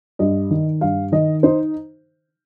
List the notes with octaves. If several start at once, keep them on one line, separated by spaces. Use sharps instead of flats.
G2 D#5
D#3
G2 F5
D#3 D#5
D#4 C5